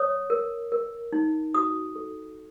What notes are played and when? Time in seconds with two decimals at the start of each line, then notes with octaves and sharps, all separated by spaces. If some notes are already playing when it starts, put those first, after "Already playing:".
Already playing: C#5 D#6
0.30 A#4
0.72 A#4
1.13 D#4
1.54 F#4 D#6
1.96 A4